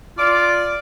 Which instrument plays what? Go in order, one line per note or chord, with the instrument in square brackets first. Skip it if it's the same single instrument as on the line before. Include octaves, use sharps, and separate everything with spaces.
[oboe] F4 [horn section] D5